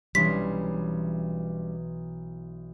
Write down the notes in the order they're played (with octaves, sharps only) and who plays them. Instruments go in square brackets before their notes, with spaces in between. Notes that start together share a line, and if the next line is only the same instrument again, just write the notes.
[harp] B1 E3 C6 [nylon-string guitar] G3 C#4 D4 [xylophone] B6